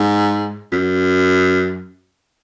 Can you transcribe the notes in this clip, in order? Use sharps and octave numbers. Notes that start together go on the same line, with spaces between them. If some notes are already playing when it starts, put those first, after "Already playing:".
Already playing: G#2
F#2